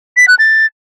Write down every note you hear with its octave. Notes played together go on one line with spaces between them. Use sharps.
B6
F#6
A6